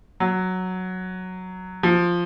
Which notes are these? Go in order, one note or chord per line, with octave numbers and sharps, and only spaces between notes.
F#3
F3